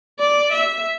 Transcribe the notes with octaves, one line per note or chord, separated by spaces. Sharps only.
D5
E5